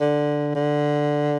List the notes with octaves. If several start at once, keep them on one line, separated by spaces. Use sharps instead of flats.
D3
D3